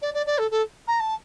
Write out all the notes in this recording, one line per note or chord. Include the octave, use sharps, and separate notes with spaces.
D5
D5
D5
A4
A4
A#5
A5